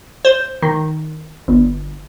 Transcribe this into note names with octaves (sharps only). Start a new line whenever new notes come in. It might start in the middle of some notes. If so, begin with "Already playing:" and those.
C5
D#3
G1